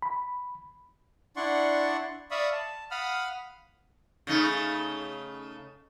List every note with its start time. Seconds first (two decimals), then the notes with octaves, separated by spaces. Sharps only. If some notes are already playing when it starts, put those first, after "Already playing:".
0.02 B5
1.36 D4 E4 D5 F#5 C6 C#6
2.31 D5 E5 F5 B5 C#6 D#6
2.52 A5
2.91 F5 F#5 B5 D#6 F6
4.27 C#3 A3 D#4